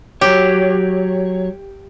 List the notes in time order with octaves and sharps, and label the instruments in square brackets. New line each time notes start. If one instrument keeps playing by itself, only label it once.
[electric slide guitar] F#3 C#5 [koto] G4